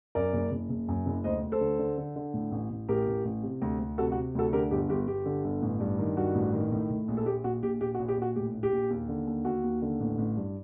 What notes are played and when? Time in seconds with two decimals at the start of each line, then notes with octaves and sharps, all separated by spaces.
0.15 F#2 A#4 D5
0.33 F#1
0.52 F#1
0.69 F#1
0.88 F#2
1.06 F#1
1.24 D2 C5 D#5
1.43 D2
1.52 A4 C5
1.61 D3
1.79 D3
1.98 D3
2.16 D3
2.34 A2
2.52 A1
2.70 A1
2.88 A1 G4 A#4
3.07 A1
3.25 A1
3.43 C3
3.62 D2
3.79 D2
3.98 C3 F#4 A4
4.12 F#4
4.16 C3
4.35 D2 F#4 A4
4.53 D3 G4 A#4
4.71 G1 G4
4.89 G1 G4
5.07 G1 G4
5.26 D3
5.44 G1
5.62 A1
5.80 G2
5.99 D#3
6.17 G2 F#4
6.35 A1
6.53 D#3
6.72 A2
6.90 A2
7.08 A#1
7.17 A4
7.26 A#1 G4
7.44 A#1 F#4
7.63 A#1 G4
7.81 A#1 G4
7.95 F#4
7.99 A#1
8.08 G4
8.17 A#1 F#4
8.36 A2 G4
8.54 A#1
8.63 G4
8.72 A#1
8.90 D#2
9.09 D3
9.27 D#2
9.45 D#2 F#4
9.64 D#2
9.82 D3
10.00 A1
10.18 A1
10.37 G2